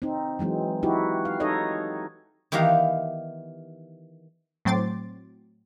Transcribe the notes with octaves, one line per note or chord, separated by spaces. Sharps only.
C4 D#4
E3 F#3 G#3 C4
D#4 E4 F#4 G4
F5
D#4 A4 C#5 D#5
D#3 E3 B3 G4 F5 A#5
A2 F#3 C4 C6 D6 A6